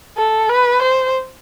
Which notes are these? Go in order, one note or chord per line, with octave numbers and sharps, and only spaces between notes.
A4
B4
C5